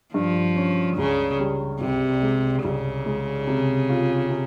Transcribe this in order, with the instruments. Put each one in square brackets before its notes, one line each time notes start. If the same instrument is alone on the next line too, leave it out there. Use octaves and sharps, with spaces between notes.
[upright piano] G2 [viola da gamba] F3
[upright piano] C#4
[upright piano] C#2 [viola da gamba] C#3
[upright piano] G3
[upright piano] C2 [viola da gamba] C3
[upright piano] G#3
[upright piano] C2 [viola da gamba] C#3
[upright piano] G#3
C3
F4
C3